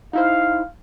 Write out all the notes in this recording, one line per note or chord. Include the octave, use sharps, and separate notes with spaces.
D#4 E4 C5 F5